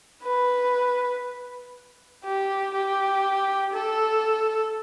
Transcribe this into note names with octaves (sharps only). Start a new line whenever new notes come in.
B4
G4
G4
A4